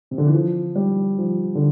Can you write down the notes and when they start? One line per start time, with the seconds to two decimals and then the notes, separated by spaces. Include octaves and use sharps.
0.11 C3
0.18 D3
0.27 E3
0.34 F3
0.76 G3
1.18 F3
1.55 D3